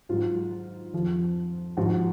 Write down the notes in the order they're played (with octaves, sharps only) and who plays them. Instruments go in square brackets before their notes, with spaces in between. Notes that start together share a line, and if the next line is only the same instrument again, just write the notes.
[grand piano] G#2 F#3 F4
F2 F3
G#2 F3 F#4